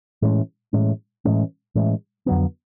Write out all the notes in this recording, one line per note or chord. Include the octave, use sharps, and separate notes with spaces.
A2 E3 G#3 C#4
A2 E3 G#3 C#4
A2 E3 G#3 C#4
A2 E3 G#3 C#4
F2 D3 F#3 B3